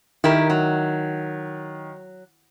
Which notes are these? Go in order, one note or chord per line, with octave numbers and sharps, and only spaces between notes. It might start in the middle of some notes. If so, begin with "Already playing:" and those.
D#3 E4 G4 A#4
F#3